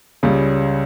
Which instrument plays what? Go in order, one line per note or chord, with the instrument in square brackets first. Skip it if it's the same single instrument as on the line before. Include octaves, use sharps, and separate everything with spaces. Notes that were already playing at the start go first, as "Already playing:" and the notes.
[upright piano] C#2 C#3 G3